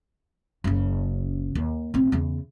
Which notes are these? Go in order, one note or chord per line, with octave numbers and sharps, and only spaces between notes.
F#1 C#3
D#2
A1 C4
E2 C#3